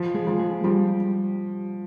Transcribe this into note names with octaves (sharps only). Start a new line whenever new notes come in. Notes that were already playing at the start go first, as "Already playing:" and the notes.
Already playing: F3
G#3 G#4
F3
G#3 G#4
F3 G3 G4